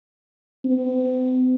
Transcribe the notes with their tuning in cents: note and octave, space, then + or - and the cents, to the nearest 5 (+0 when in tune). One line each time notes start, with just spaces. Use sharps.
C4 -45